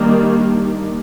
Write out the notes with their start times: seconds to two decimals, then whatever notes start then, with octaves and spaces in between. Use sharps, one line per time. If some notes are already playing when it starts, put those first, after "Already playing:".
Already playing: D#3 G3 A#3 D4